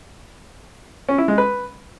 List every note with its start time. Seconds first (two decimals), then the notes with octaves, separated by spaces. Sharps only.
1.09 C#4
1.18 E4
1.28 G#3
1.38 B4